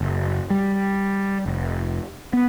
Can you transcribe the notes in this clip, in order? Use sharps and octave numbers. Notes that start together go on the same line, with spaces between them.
F#1
G3
F1
B3